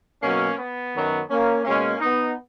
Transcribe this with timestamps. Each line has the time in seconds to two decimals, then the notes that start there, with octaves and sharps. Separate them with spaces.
0.22 B2 F#3 A#3 C#4
0.58 B3
0.94 F#2 D#3 F#3
1.29 A#3 C#4
1.65 B2 G#3 A#3 C#4
2.00 B3 D#4